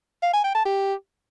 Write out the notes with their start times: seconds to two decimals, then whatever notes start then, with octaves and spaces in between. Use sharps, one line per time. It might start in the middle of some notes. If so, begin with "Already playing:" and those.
0.23 F5
0.33 G#5
0.44 G5
0.55 A5
0.66 G4